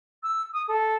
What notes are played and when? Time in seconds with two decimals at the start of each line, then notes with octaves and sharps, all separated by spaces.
0.23 E6
0.53 D#6
0.68 A4